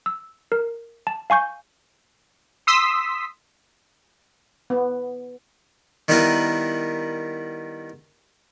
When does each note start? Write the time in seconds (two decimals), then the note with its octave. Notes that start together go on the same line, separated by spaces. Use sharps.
0.06 E6
0.52 A#4
1.07 A5
1.30 F5 G#5 C#6 G6
2.67 C6 D#6 E6 B6
4.70 B3
6.08 D#3 G3 B3 E4 A#4 B4